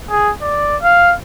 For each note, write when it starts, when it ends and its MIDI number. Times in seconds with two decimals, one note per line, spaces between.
0.11 0.32 68
0.42 0.77 74
0.82 1.15 77